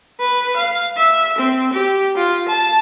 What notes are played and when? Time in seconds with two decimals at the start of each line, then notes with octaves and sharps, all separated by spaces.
0.20 B4
0.56 F5
0.97 E5
1.38 C4
1.73 G4
2.16 F4
2.48 A5